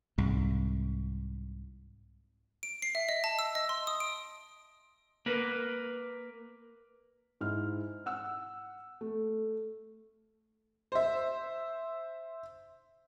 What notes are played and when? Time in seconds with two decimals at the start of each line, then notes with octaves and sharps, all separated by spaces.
0.18 C2 G#2
2.63 D7
2.82 C7
2.95 E5
3.09 D#5
3.24 A5
3.39 E6
3.55 D#5
3.69 C6
3.87 D#6
4.00 D7
5.26 A#3 A#4 B4
7.41 G#2 E4 F6
8.06 F#5 E6
9.01 A3
10.92 C5 E5